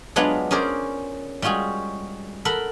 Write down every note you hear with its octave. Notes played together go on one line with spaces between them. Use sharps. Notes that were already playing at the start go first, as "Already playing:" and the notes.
F#3 G#3 B3 D4 F4 F#5
C#4 G#4 A#4 C5 D5
G3 G#3 F4 F#4 G#4
A4 A#4 F#5 B5